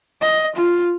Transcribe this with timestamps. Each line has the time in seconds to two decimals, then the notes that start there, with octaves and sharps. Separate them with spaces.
0.21 D#5
0.56 F4